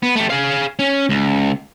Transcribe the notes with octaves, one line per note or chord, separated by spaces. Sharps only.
B3
A3 G4
G#4 F5
C#4
C#2